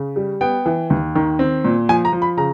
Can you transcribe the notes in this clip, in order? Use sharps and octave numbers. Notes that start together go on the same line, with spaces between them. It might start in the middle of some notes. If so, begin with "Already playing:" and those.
Already playing: C#3
G3
B3 G5
E3
D#2
D#3
C4
A#2
F3 G#5
A#5
F3
B5
C#3 A#5